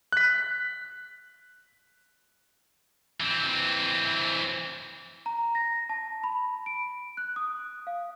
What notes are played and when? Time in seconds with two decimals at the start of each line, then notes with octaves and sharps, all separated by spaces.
0.12 F#6 B6
3.20 E3 C4
5.26 A#5
5.55 A#6
5.89 A5
6.24 B5
6.66 D7
7.17 F#6
7.36 D#6
7.87 F5